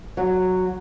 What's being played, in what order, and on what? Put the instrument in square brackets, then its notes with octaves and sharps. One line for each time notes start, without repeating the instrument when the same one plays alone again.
[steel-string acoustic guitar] F#3